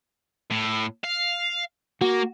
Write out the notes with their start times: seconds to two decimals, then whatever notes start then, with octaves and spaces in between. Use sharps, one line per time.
0.51 A2
1.04 F5
2.01 A#3 F#4